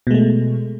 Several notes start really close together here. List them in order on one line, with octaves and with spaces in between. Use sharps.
B2 G#3 A3